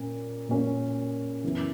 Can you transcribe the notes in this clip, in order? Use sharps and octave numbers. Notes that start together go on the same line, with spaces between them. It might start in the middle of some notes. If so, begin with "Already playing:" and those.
Already playing: A#2 A#3 C#4
A#2 A#3 C#4
F#2 C#3 E3 B3